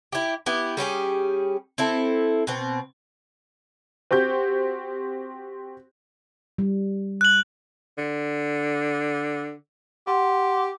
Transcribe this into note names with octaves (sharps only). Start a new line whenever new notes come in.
E4 G4
B3 E4 G4
G3 C#4 G4 G#4
C4 E4 A4
B2 C4
C4 F#4 G4 G6
G3
F#6 F#7
D3
G4 F#5 C6